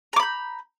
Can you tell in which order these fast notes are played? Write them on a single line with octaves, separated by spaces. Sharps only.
A#5 D6 B5 G6